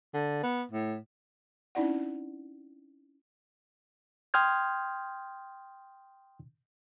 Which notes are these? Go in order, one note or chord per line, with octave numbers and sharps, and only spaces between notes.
D3
B3
A2
C4 C#4 D#4 E4 D5 F#5
G5 C6 D#6 F6 G6 G#6